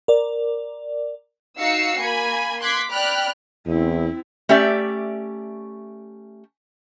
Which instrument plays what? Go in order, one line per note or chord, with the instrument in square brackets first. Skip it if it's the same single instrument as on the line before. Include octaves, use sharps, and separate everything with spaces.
[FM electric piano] A#4 D5
[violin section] D#4 F#4 F5 E6 C7 C#7
A#3 G#5 B5
C6 D6 F#6 G#6 B6
D5 G5 B5 F6 F#6
[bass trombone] E2 [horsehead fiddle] C4 E4
[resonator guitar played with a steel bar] A3 C#4 G4 D5 E5